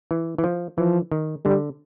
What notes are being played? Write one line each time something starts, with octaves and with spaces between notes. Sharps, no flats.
E3
E3
F3
E3 F3
D#3
D3 G3